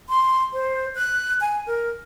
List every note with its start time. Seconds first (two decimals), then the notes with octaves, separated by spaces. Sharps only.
0.09 C6
0.53 C5
0.95 F#6
1.41 G#5
1.67 A#4